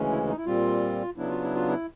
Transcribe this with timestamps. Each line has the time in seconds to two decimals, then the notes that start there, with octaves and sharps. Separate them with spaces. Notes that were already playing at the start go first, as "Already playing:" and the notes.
Already playing: D2 C#3 E3 G#3 C#4
0.11 E4
0.28 D#4
0.37 E4
0.46 A#2 G3 C4 F4
1.17 C#3 F#3 B3 D4 E4
1.29 F4
1.42 E4
1.55 F4
1.68 E4